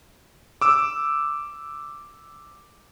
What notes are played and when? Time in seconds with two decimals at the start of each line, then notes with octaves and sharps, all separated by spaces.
0.61 D6 E6